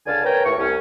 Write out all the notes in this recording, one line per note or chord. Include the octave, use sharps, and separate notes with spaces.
C#2 D3 D5 F5 G#5 A5
A#4 B4 C#5 G5 G#5 A#5
D#2 A2 B4 C#6
C2 C#4